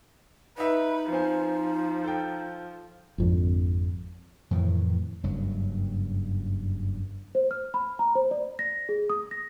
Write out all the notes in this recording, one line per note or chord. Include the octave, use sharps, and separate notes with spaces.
D#4 B4 D#5 E5
F3 C4 C5 G#5
A4 G5
G#1 F2 D3
F2 A2 D#3 E3
F#1 G2 F#3
C5
F6
B5
A#5
C5
D5
A#6
G#4
D#6
A#6